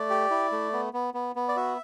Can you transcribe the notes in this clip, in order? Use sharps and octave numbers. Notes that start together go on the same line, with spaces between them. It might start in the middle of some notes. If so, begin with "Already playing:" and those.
Already playing: A3 D5
G4
E4
A3
B3
B3
B3
B3
D5
F#4 E5